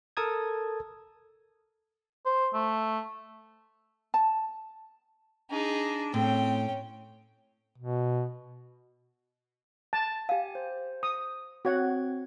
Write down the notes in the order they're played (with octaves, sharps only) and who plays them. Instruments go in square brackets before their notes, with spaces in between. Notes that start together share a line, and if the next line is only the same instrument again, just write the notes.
[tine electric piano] A4 A#4 A5 D#6 G#6
[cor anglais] C5
A3
[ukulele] A5
[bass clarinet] D4 [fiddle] D#4 G#4
[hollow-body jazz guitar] A2 [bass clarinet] C4 [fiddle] C#4 G5
[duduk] B2
[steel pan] A5
[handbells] G4 G#5 [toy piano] F5
[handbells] C5
[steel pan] D#6
[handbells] C4 G#6 [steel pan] F#4 C#5 F#5